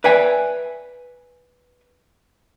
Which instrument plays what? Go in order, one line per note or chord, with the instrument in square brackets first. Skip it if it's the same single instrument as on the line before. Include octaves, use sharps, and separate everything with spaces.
[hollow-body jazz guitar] B4 D5 E5 G5 G#5